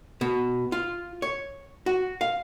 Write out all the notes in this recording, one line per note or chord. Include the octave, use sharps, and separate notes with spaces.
B2
F4
C#5
F#4
F5